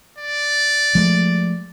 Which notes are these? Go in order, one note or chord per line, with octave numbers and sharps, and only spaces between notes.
D5
F3 G#3 A3